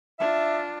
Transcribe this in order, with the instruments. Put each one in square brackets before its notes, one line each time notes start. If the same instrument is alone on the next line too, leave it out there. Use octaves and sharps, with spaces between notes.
[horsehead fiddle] D4 F4 [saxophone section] E5